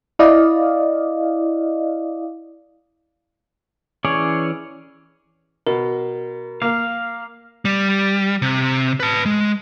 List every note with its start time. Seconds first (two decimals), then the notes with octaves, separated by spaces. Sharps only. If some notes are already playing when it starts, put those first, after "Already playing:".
0.19 E4 D5 D#5 F5
4.05 E3 C#4 G#4 C#5 D5
5.67 B2 A#4
6.62 A#3 F5
7.65 G3
8.42 C3
9.00 B4 A5
9.25 G#3